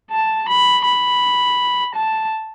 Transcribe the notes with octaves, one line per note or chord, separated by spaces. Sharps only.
A5
B5
B5
A5